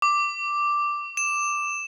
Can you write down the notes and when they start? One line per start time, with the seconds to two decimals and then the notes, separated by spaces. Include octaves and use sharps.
0.02 D6
1.17 E7